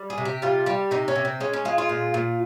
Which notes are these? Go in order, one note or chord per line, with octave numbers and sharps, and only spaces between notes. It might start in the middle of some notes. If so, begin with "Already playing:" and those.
Already playing: G3
G#4
C3
G4
G3 F4
G3 G4
C3 D#4
C#4
C3
C4
G#3 C#4
C#4
G#3 F4
F4
A#2
A#2